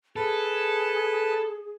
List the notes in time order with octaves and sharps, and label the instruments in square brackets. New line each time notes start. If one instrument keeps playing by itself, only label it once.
[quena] G#4 [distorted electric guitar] A4 [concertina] B4 A5